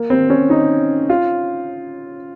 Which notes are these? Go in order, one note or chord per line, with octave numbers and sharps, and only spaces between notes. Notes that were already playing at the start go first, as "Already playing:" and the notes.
Already playing: A#3
C4
C#4
D#4
F4